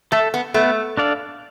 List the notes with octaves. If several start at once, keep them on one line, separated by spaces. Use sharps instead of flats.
A3 A4 E5
B3
A3 B3
D4 A4 D5 F5